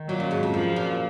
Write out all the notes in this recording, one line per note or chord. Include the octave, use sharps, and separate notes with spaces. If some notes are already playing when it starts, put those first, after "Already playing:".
Already playing: D#3
A#2 F#3
F#2
G#2
F2
F#2 F3
A#2